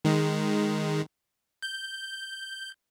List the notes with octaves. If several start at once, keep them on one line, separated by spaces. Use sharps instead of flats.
D#3 G#3
G6